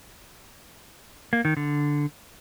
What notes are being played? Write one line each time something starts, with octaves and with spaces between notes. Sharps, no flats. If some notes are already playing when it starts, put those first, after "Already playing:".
A#3
D#3
D3